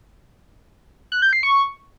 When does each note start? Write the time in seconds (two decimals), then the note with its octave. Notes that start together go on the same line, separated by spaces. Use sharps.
1.12 F#6
1.22 G6
1.33 C7
1.43 C#6